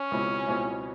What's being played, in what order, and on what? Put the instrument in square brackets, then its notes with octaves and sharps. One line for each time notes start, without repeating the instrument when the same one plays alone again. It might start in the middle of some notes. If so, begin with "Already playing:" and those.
Already playing: [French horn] C#4
[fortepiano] C#2 B2 G#3 C4 E4
C#2 B2 G#3 C4 E4